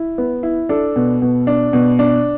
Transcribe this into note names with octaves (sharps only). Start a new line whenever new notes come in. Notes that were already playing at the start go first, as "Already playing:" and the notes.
Already playing: E4
B3
E4
D4 A4
B2
B2
D4
B2
D4